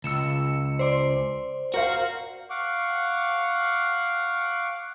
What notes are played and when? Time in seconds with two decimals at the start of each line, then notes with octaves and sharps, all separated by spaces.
0.04 C#2 E6 C#7 E7
0.79 C5 D5 C6
1.74 F#4 A#4 C5 F5
2.50 F5 F#5 C#6 D6